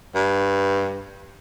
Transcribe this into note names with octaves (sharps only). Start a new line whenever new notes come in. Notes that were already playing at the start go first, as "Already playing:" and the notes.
G2